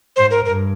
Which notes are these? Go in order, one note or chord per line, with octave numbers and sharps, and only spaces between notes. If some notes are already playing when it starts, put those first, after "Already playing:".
G#2 C5
A#4
G2 A#4